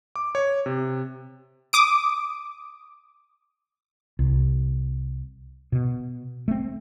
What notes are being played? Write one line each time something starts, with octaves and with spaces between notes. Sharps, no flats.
D6
C#5
C3
D6 D#6 D7
C2
B2
A3 C4